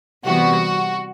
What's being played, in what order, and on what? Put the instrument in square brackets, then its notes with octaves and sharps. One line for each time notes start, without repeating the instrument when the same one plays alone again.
[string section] C3 E3 G3 B3 F#4